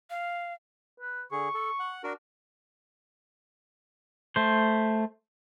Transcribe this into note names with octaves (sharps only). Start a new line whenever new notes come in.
F5
B4
D3 G#4 C#6
A4
F#5
D4 F#4 A#4
A3 C5